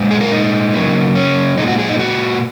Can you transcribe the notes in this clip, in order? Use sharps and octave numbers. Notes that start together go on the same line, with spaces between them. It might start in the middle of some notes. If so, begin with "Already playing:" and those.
Already playing: A#2 G#3
G#4
A#4
D#4
C#3 F#3 A#3
C#4
A#2 G#3 D#4
F#4
G#4
D#4
F#4